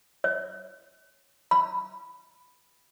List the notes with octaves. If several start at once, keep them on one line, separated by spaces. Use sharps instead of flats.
C#5
B5